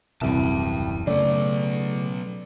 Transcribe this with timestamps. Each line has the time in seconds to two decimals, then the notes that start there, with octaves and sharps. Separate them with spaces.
0.21 D#1 C2 F#2 E3 G5 A5
1.07 C#3 F#3 A3 B3 D5